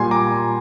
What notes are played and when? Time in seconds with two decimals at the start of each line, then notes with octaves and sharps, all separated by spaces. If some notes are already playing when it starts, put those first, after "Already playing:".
Already playing: A#2 G3 G#5 C6
0.11 A#5 D6